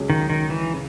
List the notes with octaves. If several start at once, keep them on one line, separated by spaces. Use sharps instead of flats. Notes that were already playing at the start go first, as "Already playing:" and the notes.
Already playing: C#2 C#3 F#3 C#4 G#4
D#3
D#3
E3
C#3